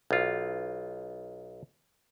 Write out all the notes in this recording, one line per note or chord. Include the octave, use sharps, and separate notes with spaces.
B1 F4